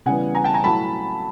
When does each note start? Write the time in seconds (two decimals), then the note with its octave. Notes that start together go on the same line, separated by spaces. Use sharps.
0.06 C#3 E3 G3 B3 F#5 G#5
0.35 G#5 A#5
0.44 G5 A5
0.54 G#5 A#5
0.64 A2 F#3 A3 A5 B5